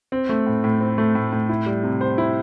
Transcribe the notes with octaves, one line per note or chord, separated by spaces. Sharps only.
C4
A3
A2
A2
C4
A3
A2
A2
E4
G3
C3
C5
E4